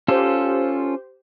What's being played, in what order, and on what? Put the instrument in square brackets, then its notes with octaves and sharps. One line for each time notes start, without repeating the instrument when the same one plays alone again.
[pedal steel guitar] C#4 F4 A4 [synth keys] G4 C5